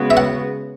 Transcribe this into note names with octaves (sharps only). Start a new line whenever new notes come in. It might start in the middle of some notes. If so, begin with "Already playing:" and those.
Already playing: C#3 G#3 B3 F#4
E5
F#5